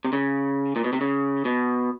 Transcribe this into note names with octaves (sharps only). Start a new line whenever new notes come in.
C3
C#3
A#2
B2
C3
C#3
B2